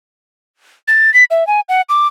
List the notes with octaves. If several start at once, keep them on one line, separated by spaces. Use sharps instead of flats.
A6
B6
E5
G#5
F#5
D6